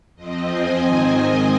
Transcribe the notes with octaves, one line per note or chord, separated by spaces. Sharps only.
F2 F3 C4 D#5
D#5 G#5
G#2 D#3 C4
D#5 G#5